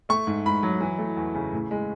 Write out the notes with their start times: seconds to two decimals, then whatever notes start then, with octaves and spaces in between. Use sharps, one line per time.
0.09 A3 C#6
0.27 G#2
0.46 G#2 B5
0.63 F#3
0.81 E3
0.98 A3
1.16 E2
1.35 C#3
1.53 A2
1.71 G#3